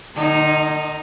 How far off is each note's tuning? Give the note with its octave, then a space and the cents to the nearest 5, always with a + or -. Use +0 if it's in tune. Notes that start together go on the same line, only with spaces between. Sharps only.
D#3 -45 D#4 +0